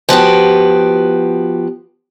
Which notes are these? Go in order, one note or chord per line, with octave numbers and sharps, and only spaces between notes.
F3 B3 F#4 G4